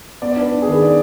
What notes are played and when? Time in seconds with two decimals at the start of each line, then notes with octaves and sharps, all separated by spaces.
0.22 B3 D5
0.32 D4 D5
0.42 B4
0.52 D4
0.62 G#4
0.67 D#3 B4
0.81 B3 D5